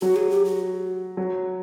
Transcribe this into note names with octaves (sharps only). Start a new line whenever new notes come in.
F#3 F#4
G#4
G4
F#4
F#3